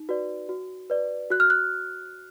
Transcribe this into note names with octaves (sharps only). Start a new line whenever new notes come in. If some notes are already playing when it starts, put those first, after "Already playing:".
Already playing: D#4
F#4 B4 D5
F#4
B4 D5
F#4 F#6
F6
F#6